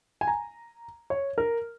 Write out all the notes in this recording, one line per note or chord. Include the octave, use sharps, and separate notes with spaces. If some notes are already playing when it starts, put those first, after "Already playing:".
G#5
A#5
C#5
A#4